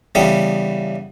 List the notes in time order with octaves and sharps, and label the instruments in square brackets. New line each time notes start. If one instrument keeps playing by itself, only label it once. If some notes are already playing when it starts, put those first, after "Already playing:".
[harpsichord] C#3 E3 G3 B3 A4